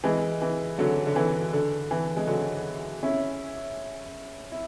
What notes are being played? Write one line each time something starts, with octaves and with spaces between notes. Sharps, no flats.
E3 G#3
E3
D3 F#3
D3
E3
D3
E3
G#3
D3 F#3
C#4 E4
E4